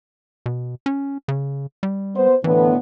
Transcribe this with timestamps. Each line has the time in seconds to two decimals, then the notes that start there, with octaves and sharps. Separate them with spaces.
0.46 B2
0.86 C#4
1.28 C#3
1.83 G3
2.15 B3 C5
2.44 A2 D3 E3 B3